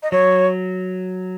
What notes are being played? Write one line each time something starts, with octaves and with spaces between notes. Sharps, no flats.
D#5
F#3 C#5